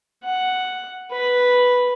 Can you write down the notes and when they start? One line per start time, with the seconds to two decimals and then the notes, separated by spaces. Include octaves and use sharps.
0.24 F#5
1.12 B4